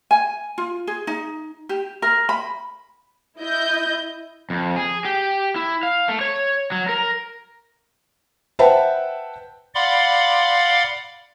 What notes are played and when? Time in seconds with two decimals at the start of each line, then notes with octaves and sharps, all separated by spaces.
0.11 G#5
0.58 F4
0.87 G#4
1.07 D#4
1.69 G4
2.02 A#4
2.29 B5
3.39 E4 D#5 G6
4.50 F2
4.76 G#4
5.05 G4
5.56 E4
5.83 F5
6.08 A3
6.21 C#5
6.72 F#3
6.89 A#4
8.59 B4 C5 E5 F#5 G5 A5
9.75 D5 F5 F#5 B5 C6 D6